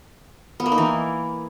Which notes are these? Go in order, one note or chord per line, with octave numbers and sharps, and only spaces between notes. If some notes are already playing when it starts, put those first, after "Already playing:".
B3
A#3
D#4
E3